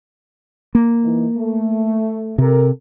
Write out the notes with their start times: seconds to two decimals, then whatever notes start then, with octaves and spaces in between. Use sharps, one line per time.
0.75 A#3
1.04 E3 D#4
1.36 A3
2.38 C3 A4 A#4